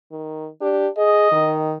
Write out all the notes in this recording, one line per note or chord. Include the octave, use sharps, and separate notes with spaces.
D#3
D4 G4
G#4 D#5
D#3